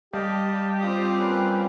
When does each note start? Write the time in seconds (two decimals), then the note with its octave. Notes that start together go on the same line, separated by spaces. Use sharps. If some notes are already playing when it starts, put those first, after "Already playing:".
0.13 G3 G4 D#5 F5 A5
0.81 C4 F4 D6 D#6
1.19 A#3 C#4 B4